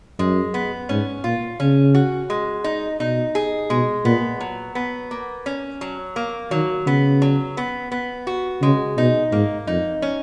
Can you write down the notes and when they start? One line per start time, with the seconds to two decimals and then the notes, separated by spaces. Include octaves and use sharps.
0.19 F#2 G#3
0.54 B3
0.89 G#2 C#4
1.24 A#2 F4
1.60 C#3 C#4
1.95 F#4
2.30 G#3
2.64 D#4
3.00 B2 D#4
3.35 G#4
3.70 B2 G#3
4.05 A#2 B3
4.40 F#3
4.75 B3
5.11 A#3
5.46 C#4
5.81 F#3
6.16 A#3
6.51 D#3 F#3
6.86 C#3 B3
7.22 F#3
7.57 B3
7.92 B3
8.27 F#4
8.61 C#3 G#3
8.97 B2 D#4
9.32 G#2 A#3
9.67 F2 D#4
10.02 C#4